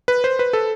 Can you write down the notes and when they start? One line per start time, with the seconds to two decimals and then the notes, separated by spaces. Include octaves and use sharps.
0.08 B4
0.24 C5
0.39 B4
0.53 A4